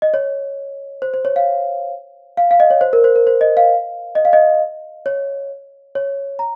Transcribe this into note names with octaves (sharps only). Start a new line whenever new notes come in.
D#5
C#5
C5
C5
C#5
F5
F5
F5
D#5
C#5
C5
A#4
C5
A#4
C5
D#5
F5
D#5
F5
D#5
C#5
C#5
A#5